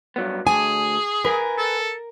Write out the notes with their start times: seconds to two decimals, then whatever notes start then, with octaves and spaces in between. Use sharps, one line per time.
0.16 G2 F#3 B3
0.47 D2 G#4 G#5
1.25 A#4 B4 G#5
1.58 A4